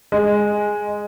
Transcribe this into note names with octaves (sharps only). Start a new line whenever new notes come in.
G#3